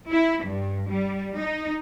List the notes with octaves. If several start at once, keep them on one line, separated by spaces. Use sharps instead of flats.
E4
G2
G3
D#4